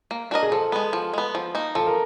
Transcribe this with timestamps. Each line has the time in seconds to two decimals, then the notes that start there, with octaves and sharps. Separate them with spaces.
0.11 A#3
0.31 D4 F#4 A#4 D#5
0.43 G#4
0.52 F3 A4
0.72 G#3 B3
0.93 F3
1.14 G#3 B3
1.35 F3
1.55 A#3 D#4
1.75 F3 A4
1.87 A#4